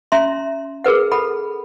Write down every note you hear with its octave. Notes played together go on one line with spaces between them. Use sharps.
C#4 E5 A#5 C6
G#4 A#4 B4 F#5
A4 F#5 B5